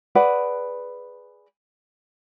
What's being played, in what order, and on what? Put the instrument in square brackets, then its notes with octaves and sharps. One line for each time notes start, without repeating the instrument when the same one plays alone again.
[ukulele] G#4 B4 D5 F#5